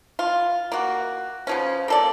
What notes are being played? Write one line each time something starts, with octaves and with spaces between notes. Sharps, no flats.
F4
A#3 F#4
C#3 F3 C#4
A#3 A4 D5